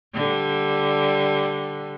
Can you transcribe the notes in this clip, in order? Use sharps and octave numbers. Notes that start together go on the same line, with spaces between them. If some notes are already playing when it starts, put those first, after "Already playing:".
D3 G3